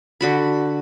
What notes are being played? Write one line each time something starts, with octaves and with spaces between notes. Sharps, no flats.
D3 F#4 B5